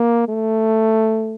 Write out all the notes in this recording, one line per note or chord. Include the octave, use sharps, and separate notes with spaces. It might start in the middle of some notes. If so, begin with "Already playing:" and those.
Already playing: A#3
A3